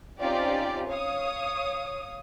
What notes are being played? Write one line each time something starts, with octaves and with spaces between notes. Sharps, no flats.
C4 C#4 D#4 F4 G4 D5
C#5 F5 D#6